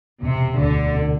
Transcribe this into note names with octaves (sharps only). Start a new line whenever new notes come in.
E1 C3
D2 D3
C3